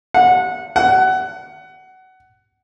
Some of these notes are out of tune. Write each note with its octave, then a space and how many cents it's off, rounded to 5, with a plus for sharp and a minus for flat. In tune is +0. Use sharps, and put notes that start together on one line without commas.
F#5 -20
F#5 +20